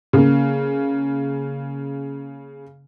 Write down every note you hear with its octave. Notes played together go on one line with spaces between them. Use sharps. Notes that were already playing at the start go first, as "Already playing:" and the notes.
C#3 A#3